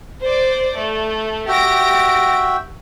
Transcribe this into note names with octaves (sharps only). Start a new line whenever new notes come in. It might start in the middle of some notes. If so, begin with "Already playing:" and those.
C5 D5
A3
F#4 G4 E5 G5 A#6 D7